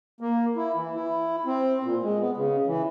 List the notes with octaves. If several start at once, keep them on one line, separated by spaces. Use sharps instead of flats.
A#3
E4
E3
E4
C4
A#2
G#3
B3
C#3
E3